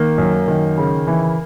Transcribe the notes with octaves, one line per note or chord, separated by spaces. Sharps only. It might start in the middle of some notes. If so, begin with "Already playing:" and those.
Already playing: D#3 A#3
F#2
D#3
C#3
E3